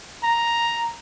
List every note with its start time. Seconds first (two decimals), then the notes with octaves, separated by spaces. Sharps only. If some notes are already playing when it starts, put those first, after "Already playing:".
0.24 A#5